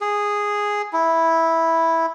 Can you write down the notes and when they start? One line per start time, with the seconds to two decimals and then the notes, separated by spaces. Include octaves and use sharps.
0.01 G#4
0.93 E4